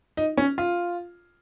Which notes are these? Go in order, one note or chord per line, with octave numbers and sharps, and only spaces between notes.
D#4
C#4
F4